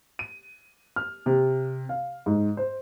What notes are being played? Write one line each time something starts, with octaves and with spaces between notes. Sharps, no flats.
D#7
F6
C3
F5
G#2
C5